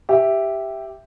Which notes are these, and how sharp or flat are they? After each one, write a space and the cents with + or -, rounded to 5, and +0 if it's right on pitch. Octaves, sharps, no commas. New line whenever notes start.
G4 +0 E5 +0